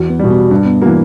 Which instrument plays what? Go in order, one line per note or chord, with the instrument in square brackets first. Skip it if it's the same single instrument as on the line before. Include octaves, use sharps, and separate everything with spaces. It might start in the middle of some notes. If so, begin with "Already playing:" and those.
Already playing: [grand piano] E2 [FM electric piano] F#4
[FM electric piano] B3
[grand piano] B2 G3
[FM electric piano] B3
[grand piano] G2 [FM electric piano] D4
[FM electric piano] B3
[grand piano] E3 A#3 [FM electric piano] F#4